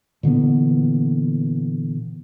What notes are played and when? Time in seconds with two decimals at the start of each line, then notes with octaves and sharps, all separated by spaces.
0.23 A#2 D3 E3 B3